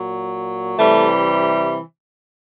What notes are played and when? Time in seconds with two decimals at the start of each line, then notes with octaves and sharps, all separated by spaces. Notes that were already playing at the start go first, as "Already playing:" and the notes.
Already playing: A#2 F#3
0.78 C3 E3 G3 A3